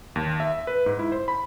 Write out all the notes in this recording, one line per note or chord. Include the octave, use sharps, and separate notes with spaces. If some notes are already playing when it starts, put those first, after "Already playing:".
D#2
E5
B4
G#2
E4
C5
B5